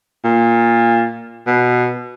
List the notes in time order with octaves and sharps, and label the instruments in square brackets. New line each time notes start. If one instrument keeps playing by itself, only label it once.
[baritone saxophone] A#2
B2